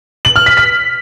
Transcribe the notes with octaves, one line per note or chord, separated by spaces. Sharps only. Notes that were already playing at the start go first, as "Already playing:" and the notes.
F#7
F6
B6
B6